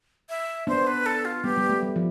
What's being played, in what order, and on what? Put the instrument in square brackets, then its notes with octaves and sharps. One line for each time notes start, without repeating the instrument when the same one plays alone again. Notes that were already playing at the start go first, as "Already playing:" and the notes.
[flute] E5
[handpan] B3 D4 [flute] C5
[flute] B4
A4
F4
[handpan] G3 B3 [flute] G4
[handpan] G3 B3
A3
G3
F3